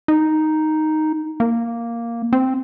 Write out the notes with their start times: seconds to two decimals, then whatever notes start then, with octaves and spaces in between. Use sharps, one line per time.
0.08 D#4
1.40 A#3
2.33 C4